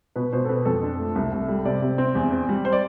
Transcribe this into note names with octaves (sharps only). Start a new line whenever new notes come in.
B2 B4
B2 C5
A4
C4 B4
F2 A4
D4
A3
C2
C2
G3
C3 D5
C3
C4
E2
C4
G3
C5
D5